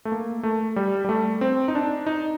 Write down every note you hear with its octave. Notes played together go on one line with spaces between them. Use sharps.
A3
A#3
A3
G3
G3
A3
C4
D#4
D4
D#4